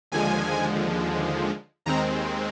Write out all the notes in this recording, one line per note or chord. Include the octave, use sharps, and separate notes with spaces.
D#2 D3 F3 G#3 G#5
D#2 D#3 G#3 C4 A#5